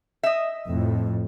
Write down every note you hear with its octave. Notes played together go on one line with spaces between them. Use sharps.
D#5 E5
F2 A2